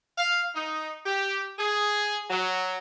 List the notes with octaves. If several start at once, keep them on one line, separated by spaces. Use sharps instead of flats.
F5
D#4
G4
G#4
F#3